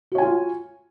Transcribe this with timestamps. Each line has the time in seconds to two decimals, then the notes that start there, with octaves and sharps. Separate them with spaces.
0.12 F#4
0.15 C#5
0.18 G#5
0.22 F4